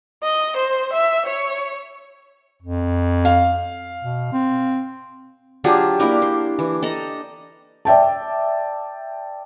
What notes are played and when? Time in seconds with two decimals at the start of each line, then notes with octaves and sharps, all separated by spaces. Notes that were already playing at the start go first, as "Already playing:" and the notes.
0.24 D#5
0.57 C5
0.94 E5
1.26 C#5
2.62 F2
3.25 F5
4.03 B2
4.32 C4
5.64 F#3 D4 F4 G4 G#4 A5
6.00 A#3 D4 E4 A#4
6.22 C6
6.59 E3
6.83 A4 D#5 A#5
7.85 D5 E5 G5 A5